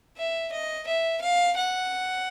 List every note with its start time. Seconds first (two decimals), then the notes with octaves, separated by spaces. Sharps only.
0.18 E5
0.52 D#5
0.87 E5
1.22 F5
1.56 F#5